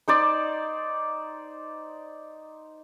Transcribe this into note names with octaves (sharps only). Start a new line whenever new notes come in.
D#4 C5 D5